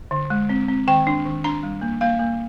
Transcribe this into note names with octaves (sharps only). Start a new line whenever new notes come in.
D3
G#3
C4
C4
D#3 G5
D4
D#3
D4 A#5
G3
A#3
A#3 F5
A#3